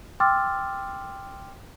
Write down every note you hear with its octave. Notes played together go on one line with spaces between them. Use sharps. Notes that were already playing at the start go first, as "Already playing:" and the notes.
G5 C6 D6 E6 F6 A6